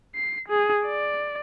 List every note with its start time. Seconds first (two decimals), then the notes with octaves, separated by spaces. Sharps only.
0.15 C7
0.48 G#4
0.86 D5